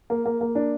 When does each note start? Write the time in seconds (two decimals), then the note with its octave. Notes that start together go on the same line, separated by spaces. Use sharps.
0.10 A#3
0.26 A#3
0.41 A#3
0.55 D4